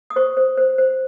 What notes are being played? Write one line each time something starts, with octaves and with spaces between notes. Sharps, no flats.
D#6
C5 C#6
C5
C5
C5